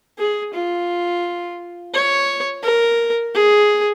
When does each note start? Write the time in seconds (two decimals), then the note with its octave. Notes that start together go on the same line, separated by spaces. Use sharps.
0.18 G#4
0.54 F4
1.94 C#5
2.63 A#4
3.35 G#4